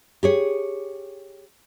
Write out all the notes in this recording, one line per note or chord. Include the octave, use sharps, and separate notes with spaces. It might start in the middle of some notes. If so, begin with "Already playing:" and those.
G4 G#4 C#5